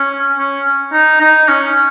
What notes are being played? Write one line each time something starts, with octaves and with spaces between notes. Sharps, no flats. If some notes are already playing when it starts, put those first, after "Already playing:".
Already playing: C#4
C#4
D#4
D#4
C#4